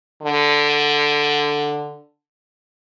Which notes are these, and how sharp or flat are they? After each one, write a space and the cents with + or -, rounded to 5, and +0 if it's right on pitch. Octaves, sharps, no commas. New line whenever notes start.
D3 +0